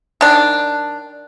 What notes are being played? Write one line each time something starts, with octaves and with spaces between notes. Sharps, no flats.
D#3 D4